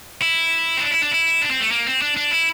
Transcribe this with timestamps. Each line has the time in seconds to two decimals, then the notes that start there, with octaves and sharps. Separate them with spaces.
0.22 E4
0.77 C4
0.81 D4
0.91 E4
1.02 D4
1.12 E4
1.42 D4
1.51 C4
1.61 A3
1.71 A#3
1.86 C4
2.02 D4
2.17 D4
2.31 E4